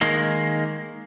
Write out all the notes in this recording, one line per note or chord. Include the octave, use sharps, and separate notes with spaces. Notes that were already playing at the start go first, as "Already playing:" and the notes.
D#3 G#3 A#3